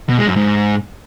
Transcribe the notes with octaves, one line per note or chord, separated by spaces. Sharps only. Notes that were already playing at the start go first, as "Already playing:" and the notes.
B2
G#3
F#2
G#2